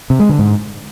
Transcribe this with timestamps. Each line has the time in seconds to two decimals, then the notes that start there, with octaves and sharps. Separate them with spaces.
0.10 C3
0.20 G#3
0.29 D3
0.39 G#2